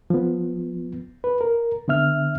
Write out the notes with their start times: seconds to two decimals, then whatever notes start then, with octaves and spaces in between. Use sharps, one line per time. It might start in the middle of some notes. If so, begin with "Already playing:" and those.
0.10 F3 B3
1.24 B4
1.41 A#4
1.88 D3 B3 E5 F6